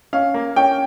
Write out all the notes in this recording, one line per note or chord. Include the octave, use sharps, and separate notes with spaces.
C#4 F5
A#3
C#4 G5